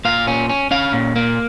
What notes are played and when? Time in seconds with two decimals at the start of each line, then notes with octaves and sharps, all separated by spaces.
0.05 A#2 F5
0.27 C#4
0.49 C#4
0.71 C#4 F5
0.93 A#2
1.16 A#3